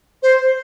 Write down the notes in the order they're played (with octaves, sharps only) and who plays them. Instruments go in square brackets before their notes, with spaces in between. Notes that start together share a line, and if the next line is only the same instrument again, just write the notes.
[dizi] C5